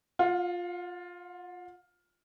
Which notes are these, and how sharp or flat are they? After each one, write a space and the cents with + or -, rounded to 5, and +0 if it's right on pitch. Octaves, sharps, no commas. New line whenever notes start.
F4 +10 F#5 -40